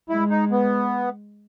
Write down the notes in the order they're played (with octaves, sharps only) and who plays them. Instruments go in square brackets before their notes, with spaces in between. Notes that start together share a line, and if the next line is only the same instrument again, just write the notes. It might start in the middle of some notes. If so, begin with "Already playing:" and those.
[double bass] G#3 [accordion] E4
[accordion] D#4
B3